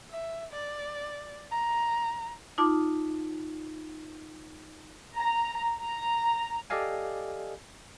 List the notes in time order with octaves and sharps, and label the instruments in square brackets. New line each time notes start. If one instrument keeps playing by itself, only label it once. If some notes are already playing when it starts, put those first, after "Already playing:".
[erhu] E5
D5
A#5
[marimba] D#4 F4 A5 D6
[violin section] A#5
A#5
[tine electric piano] G4 A4 D5 D#5 F5 G#5